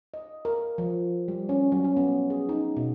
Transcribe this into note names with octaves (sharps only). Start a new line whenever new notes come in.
D#5
A#4
F3
G3
C#4
F#3
C#4
B3
G#4
D#4
B2